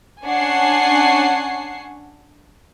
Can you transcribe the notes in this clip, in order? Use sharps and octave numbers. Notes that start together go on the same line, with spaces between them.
C#4 D4 F#5 G#5 C#6 C7